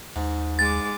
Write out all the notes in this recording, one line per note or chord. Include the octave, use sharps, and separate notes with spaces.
D#2 G#2
G#3 D6 A6